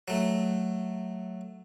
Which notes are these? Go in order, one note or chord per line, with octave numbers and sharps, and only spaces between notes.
F#3 A3